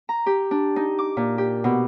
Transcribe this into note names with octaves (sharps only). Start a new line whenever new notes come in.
A#5
G4
D4
D#4
D6
A#2
G4
B2